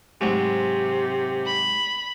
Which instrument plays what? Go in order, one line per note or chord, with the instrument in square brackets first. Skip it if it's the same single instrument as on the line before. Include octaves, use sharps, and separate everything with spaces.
[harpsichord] G#2 F#3 G#3 [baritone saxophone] C3
[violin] B5